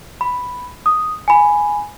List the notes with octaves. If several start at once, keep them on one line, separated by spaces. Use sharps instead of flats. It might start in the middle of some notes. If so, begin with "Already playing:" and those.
B5
D#6
G#5 B5